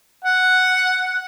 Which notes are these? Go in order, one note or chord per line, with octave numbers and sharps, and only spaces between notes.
F#5